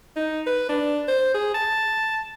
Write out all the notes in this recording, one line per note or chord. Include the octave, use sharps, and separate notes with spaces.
D#4
B4
D4
C5
G#4
A5